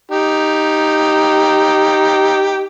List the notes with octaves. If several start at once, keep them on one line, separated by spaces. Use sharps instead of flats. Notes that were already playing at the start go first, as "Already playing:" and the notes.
D#4 G4